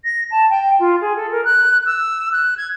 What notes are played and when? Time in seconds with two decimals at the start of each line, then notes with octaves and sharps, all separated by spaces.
0.04 A#6
0.30 A5
0.50 G5
0.79 F4
1.01 G#4
1.16 A4
1.31 A#4
1.44 F#6
1.85 E6
2.32 F#6
2.57 G#6